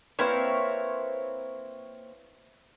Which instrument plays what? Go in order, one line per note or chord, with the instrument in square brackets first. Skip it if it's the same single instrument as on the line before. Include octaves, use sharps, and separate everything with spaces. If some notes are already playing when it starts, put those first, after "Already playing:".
[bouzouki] A#3 C4 [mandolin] E4 C#5 [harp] B4 F5 C6